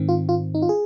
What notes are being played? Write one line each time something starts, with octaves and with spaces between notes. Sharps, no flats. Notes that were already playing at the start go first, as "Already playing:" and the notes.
Already playing: G#2 D#3 C4
F4
F4
D#4
F4
G#4